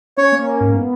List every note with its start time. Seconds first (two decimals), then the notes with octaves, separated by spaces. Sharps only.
0.17 C#4 C#5
0.32 A#3
0.46 C#4
0.61 G#2
0.74 B3